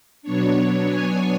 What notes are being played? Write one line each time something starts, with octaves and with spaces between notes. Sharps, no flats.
B2 F#3 B3 D4 C#5
G#5